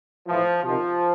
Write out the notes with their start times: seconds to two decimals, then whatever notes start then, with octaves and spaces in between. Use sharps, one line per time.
0.27 A2 E3 F3
0.63 C3 D#3 F3